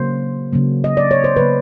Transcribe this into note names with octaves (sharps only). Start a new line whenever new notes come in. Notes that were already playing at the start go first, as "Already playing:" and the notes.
Already playing: C#3 F#3 A#3 C5
C#3 F#3 A#3
D#5
D5
C#5
C5
C#3 F#3 A#3 B4